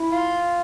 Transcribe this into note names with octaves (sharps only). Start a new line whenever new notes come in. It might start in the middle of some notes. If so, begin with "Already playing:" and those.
Already playing: E4
F4